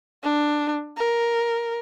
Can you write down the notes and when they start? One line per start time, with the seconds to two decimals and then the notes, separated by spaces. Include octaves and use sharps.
0.23 D4
0.97 A#4